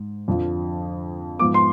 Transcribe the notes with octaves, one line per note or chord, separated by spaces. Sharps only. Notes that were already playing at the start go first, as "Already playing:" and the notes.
Already playing: G#2
F2 D3 F3
G#2 F3 B3 D6
C6